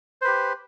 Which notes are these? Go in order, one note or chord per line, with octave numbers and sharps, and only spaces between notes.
G4 B4 C5